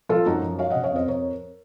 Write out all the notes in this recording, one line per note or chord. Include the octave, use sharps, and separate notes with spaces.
F3 F4 A4
F#2 D#4 F#4
F3
F#3 C#5 F5
C#3 D#5 F#5
C#5 F5
F2 C5 D#5
F2 A#4 C#5